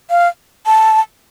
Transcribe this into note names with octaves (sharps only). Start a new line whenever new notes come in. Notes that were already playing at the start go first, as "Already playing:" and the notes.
F5
A5